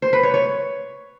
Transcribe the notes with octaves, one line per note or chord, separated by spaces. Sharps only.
C5
B4
C#5
C#5